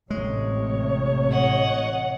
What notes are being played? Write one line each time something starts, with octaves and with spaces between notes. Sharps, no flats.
A1 A2 C3 G#3 C#5
D#5 F#5